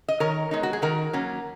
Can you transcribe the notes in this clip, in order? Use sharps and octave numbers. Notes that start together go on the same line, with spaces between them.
D#5
D#3 A#4 C#5
G#3 B3 D#4
F#4
G#4
D#3 F#4 A#4
F#3 A#3 C#4